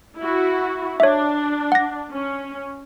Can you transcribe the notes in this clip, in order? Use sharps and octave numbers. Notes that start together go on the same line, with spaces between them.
E4 F#4
D4 C#5 E5
F#5 A#6
C#4